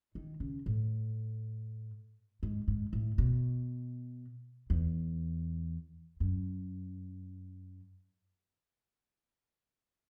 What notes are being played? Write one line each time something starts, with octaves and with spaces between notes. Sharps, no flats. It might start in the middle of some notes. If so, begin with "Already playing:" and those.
D#3
C#3
A2
G#2
G#2
A2
B2
E2
F#2